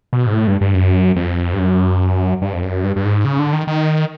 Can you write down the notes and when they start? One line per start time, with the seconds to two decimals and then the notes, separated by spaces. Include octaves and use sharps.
0.13 B2
0.27 G#2
0.33 A2
0.47 G2
0.61 G2
0.74 F#2
1.16 F2
1.53 G2
1.59 F#2
2.42 G2
2.53 F2
2.62 F#2
2.84 G2
2.96 G2
3.05 G#2
3.25 C#3
3.39 D3
3.53 D#3
3.67 D#3